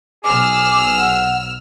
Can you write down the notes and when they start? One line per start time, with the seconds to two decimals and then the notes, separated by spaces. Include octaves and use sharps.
0.24 B1 G#4 D6 E6 F6
0.97 F#5